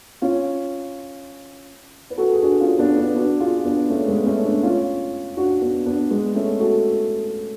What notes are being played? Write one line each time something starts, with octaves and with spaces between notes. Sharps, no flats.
C#4 F4
B4
F#4 A4
G#4
D4 F#4
C#4 F4
B3 D4
B3 D4
D4 F#4
F4 G#4
B3 D4
A3 C#4
G#3 B3
A3 C#4
B3 D4
C#4 F4
D4 F#4
B3 D4
B3 D4
G#3 B3
A3 C#4
F#4 A4